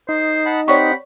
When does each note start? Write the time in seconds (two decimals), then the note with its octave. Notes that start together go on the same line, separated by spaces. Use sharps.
0.09 D#4 C5
0.46 F#5 A5 B5
0.68 C4 G4 C#5 D5 F#5 B5 C#6